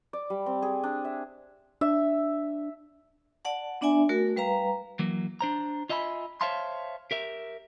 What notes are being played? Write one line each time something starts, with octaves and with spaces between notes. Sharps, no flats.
D5
G3
C4
G#4
D4
E5
D4 E5
D5 F#5 A5
B3 D4 D5 E5 G#5
A3 F#4 A#4
G3 B4 F5 A#5
E3 F#3 A#3
D4 C5 A#5
F4 D#5 E5 G#5 A#5 B5
C5 C#5 E5 F5 A5 C6
G4 A#4 E5